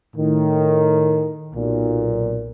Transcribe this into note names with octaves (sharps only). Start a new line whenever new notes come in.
A2 D#3
B1 A#2